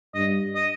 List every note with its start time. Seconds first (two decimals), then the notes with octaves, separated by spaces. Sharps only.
0.14 G2 D#5
0.55 D#5